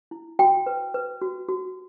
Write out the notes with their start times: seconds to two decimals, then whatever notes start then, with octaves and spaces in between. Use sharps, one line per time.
0.11 E4
0.39 F#4 G5
0.66 B4
0.94 B4
1.22 F#4
1.48 F#4